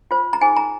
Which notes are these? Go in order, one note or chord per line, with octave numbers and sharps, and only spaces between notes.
F4 C5
A#5
D#4 G#4 C5 G#5
A#5